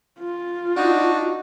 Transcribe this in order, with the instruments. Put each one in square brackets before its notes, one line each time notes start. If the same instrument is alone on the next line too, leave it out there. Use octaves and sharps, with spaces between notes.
[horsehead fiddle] F4
[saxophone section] D4 D#4 [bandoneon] F#4